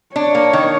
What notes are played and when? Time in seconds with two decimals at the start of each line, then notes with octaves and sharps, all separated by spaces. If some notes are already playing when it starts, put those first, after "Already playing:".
0.15 D4 C#5
0.35 A#3
0.53 D#3